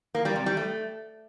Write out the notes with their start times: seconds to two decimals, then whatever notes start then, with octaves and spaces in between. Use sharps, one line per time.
0.15 A#3
0.25 G3
0.36 C3
0.46 G3
0.57 A3